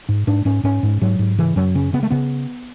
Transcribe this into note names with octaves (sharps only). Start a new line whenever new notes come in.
G#2
G#2 D4
G#2 C#4
G#2 C#4
G#2
G#2 F#3
G#2
C#3 E3
F#2 F#3
C#3 C#4
C#3 B3
A3
C#3 B3